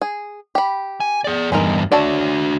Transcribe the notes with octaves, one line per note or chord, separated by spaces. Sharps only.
G#4
G4 B5
G#5
G#4 D5
E2 G2 G#3 D#4 A#4
D4 F#4 A4 C#5 D5